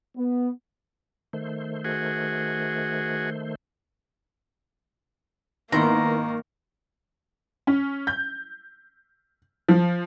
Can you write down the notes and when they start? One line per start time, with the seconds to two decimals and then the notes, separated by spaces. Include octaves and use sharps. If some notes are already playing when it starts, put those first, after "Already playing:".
0.17 B3
1.33 D#3 A3 C5
1.84 F#4 G#4
5.72 G#1 D#3 A#3 B3 E4 C5 A#5
7.67 C#4
8.07 G6
9.68 F3